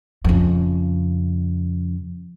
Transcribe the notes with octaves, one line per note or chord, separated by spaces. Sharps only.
F2 C#3